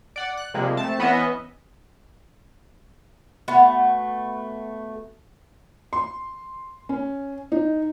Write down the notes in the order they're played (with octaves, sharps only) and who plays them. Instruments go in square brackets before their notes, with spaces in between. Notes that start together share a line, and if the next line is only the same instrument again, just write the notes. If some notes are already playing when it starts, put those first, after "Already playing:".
[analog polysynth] D5 F#5
F#6
C3 F3 G3 G#3 A#3
A3 C4 A5
E3 B3 C#4 D#5 E5
[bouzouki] A3 B3 F#4
[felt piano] C6
C#4
D#4